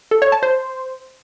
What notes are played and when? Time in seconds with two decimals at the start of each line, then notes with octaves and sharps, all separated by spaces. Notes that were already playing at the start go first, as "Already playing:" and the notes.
0.11 A4
0.22 C#5
0.32 A5
0.43 C5